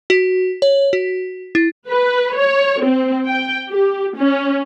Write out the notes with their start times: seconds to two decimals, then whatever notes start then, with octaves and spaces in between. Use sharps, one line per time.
0.10 F#4
0.62 C#5
0.93 F#4
1.55 E4
1.89 B4
2.37 C#5
2.83 C4
3.26 G5
3.70 G4
4.17 C#4